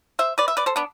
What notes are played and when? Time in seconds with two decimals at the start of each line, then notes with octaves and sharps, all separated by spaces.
0.19 C5 E5
0.38 B4 D5
0.48 E5
0.57 B4 D5
0.66 A4 C5
0.76 B3 D4